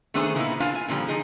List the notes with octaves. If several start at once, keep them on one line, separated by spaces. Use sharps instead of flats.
D#3 A3 B3 D4 G#4 C5
A#2 E3 A#3 B3 D#4 E4
D4 F4 F5 G#5 A5
G#5
A#2 D3 F3 G3
F3 D#4 G#4